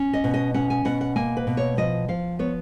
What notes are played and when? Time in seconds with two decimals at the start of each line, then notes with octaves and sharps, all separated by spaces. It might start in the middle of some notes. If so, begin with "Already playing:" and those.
Already playing: C#4
0.13 D#5
0.24 B2
0.34 D#5
0.54 C#4 F#5
0.70 G#5
0.85 B2 F#5
1.01 F#5
1.16 A#3 G#5
1.37 B4
1.47 B2
1.57 C#5
1.77 F3 D#5
2.08 F3 F5
2.39 B3 C#5